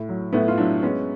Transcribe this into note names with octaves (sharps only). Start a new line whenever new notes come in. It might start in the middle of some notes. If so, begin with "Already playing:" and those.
Already playing: A2
F#3
A2 A3 B3
F4
F#3 D4 E4
G#3 B3 C#4